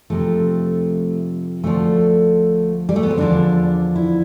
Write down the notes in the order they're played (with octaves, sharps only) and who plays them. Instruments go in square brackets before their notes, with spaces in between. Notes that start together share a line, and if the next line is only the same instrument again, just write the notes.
[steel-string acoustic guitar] F2 C3 F3 A3
D2 D3 F3 A3
G3
A3
B3
C4
E2 D3 F3 D4
E4